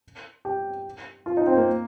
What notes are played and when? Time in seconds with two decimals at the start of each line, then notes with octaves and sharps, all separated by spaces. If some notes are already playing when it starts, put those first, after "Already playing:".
0.45 G4
1.26 F4
1.37 D#4
1.46 C4
1.57 A#3